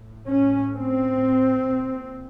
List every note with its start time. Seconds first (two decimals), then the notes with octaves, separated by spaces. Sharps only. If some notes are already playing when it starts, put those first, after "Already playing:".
Already playing: A2
0.26 C#4
0.74 C4
1.69 A#2